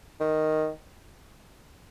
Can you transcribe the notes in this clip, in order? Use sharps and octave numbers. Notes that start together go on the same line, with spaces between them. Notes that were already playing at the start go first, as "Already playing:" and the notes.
D#3